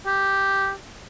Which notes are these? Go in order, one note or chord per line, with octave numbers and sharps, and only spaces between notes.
G4